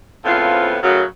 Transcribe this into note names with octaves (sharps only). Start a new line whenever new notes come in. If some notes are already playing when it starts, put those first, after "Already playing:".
A2 C#3 F3 B3 C4 F4
F#2 A2 C#3 F#3